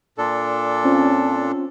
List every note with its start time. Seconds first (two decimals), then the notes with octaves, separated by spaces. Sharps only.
0.18 A#2 D4 A4
0.84 C4 C#4 F4